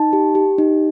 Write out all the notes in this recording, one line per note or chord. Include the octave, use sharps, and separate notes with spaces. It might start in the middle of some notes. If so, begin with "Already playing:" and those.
Already playing: D#4 A5
G4
G4
D#4